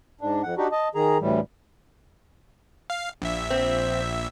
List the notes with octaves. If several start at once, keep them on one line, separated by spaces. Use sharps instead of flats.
G#2 D4
F2 F#5
D4 D#4 F#4 G4
D#5 A5
D#3 G#4 A#5
D2 A2 E3 G3
F5
A#1 E5
C4